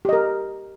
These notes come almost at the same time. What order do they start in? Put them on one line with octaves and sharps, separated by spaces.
G4 D#5 A#4